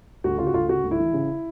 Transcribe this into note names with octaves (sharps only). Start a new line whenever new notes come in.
D2 F#4
C#3 F4
F#4
D2 F4
C#3 F#4
D2
E4
E3
C#3